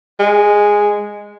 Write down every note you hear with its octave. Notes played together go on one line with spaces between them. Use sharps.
G#3